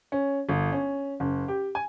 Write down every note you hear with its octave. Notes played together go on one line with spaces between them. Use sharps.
C#4
G1
C#4
F#1
G4
G#5